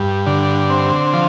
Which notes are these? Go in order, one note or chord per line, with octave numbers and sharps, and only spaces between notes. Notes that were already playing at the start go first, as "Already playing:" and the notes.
Already playing: G2
D3
C4
F3